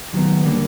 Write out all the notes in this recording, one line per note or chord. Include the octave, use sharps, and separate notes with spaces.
D#2 D#3 F#3 B3
D3 G3 A#3